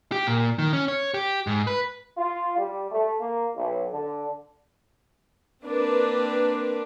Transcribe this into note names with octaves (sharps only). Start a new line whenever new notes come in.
G4
A#2
D#3
C#4
C#5
G4
G#2
B4
F4
G3
A3
A#3
B1
D3
A#3 C4 D4 B4